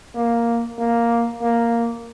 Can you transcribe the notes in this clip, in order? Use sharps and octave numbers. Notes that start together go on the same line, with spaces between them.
A#3
A#3
A#3